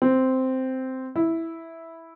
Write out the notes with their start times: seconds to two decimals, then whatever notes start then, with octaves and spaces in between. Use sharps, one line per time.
0.02 C4
1.16 E4